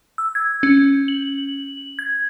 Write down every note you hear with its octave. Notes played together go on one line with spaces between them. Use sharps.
E6
G#6
C#4
F#7
G#6